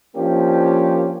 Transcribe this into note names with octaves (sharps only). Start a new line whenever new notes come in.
F3 A#3 C#4 D4 G4